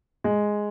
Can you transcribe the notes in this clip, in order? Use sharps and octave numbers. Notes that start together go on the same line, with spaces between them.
G#3